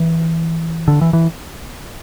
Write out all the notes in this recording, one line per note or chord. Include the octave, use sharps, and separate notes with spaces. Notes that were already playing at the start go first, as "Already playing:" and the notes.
Already playing: E3
D3
E3
E3